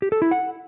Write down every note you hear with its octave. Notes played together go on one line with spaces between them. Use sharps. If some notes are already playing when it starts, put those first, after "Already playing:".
G4
A4
E4
F#5